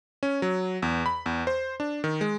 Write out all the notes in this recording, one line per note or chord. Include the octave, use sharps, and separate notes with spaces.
C#4
F#3
E2
B5
E2
C5
D4
D#3
G#3